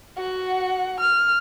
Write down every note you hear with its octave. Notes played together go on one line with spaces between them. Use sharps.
F#4 F#5
F6